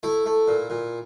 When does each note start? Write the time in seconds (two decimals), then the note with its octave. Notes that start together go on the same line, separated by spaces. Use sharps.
0.03 A3 E4
0.26 A3
0.48 A#2
0.70 A#2